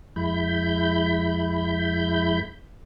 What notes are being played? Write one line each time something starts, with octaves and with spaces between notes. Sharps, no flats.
F2 G#3 E4 B5 G6